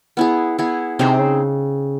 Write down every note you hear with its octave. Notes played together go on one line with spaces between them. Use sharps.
B3 E4 G#4
B3 E4 G#4
C3 C4 D#4 G#4 C5
C#3